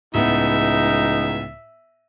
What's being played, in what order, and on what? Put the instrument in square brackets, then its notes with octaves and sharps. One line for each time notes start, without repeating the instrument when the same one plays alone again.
[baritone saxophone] C#2 [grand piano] A2 B3 [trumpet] D#4 [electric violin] E5